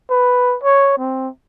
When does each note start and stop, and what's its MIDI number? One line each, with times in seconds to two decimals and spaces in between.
0.10 0.56 71
0.63 0.96 73
0.98 1.29 60